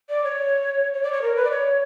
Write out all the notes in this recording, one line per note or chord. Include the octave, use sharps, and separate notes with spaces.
D5
C#5
C#5
D5
C#5
A#4
B4
D5
C#5